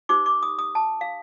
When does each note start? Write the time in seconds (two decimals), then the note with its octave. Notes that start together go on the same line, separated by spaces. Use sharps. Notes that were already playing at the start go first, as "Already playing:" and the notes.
0.09 D#4 G4 C5 D6
0.26 D6
0.43 D#6
0.59 D#6
0.75 A5
1.01 F5